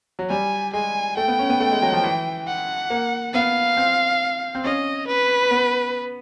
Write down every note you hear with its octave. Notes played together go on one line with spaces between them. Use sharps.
F#3
G3 G#5
G#3 G#5
A3 G5
B3
C#4
B3
A3
G#3
F#3
F3
E3
F#5
A#3
B3 F5
C4
C4
C#4 D#5
B4
B3